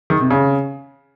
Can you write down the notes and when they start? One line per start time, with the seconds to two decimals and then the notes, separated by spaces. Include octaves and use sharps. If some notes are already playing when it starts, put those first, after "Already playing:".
0.10 D#3
0.21 C3
0.31 C#3